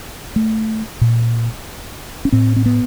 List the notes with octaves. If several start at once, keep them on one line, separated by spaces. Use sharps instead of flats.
A3
A#2
C#4
A2 C4
C4
B3